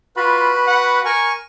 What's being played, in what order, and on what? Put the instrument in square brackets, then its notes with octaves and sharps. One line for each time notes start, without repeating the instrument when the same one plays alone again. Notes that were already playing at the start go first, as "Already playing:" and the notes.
[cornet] F4 [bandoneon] F#4 B5 [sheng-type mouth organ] B4
[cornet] F#5
[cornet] A#4 [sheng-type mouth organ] G#5 C#6